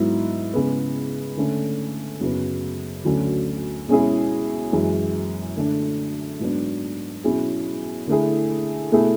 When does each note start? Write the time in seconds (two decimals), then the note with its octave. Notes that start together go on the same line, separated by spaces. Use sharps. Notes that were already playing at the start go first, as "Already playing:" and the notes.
Already playing: G#2 F#3 B3 E4
0.53 C#3 G#3 B3
1.37 D3 A3 C#4
2.21 F#2 C#3 F#3 B3
3.05 D2 D3 F#3 C#4
3.88 B2 G#3 C#4 E4 G#4
4.73 F#2 E3 G#3
5.56 D3 A3 D4
6.40 G#2 F#3 B3 D4
7.24 B2 F#3 C#4 E4 G#4
8.07 D3 A3 E4 G#4
8.92 B2 A3 E4 G#4